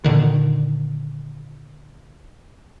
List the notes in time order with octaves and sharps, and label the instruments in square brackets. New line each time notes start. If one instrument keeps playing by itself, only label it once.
[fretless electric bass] A#2 D3 D#3